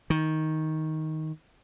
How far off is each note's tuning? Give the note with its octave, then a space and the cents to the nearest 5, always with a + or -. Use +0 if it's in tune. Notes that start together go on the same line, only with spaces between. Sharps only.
D#3 +10